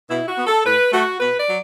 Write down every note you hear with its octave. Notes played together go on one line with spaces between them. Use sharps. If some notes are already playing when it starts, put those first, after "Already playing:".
B2 E4
F#4
B3
A4
A2 B4
A3 F#4
B2 B4
D5
F#3